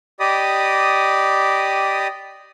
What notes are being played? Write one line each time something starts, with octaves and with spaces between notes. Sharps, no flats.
G4 D5 D#5 B5 D#6